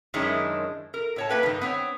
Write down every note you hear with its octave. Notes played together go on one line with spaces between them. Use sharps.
F#2 D#3 G#3 C#4 D4 E4
A#4
A2 C#5 A5
A#3 B4 G5
G2 D#3
B3 C4 C#5 G5